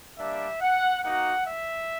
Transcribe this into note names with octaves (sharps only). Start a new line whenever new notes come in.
G3 A#3 D4 E5
F#5
A#3 D#4 F#4 F#5
E5